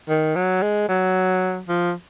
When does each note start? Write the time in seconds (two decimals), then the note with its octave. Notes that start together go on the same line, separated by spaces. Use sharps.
0.09 D#3
0.36 F#3
0.62 G#3
0.89 F#3
1.69 F3